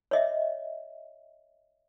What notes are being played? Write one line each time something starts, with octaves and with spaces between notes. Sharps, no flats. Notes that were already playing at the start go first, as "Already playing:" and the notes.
C#5 D#5 E5